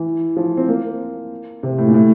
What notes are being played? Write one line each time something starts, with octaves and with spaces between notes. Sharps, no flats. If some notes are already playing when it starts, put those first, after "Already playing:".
Already playing: E3
F3
C4
A#3
C3
A2
A#2
A2